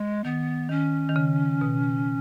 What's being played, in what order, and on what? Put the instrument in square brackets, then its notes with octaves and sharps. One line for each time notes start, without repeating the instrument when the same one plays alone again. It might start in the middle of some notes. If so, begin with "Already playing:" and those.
Already playing: [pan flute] G#3
[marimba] D#3 [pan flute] B3
[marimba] D#3 [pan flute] C#4
[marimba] D#3
C#3
B2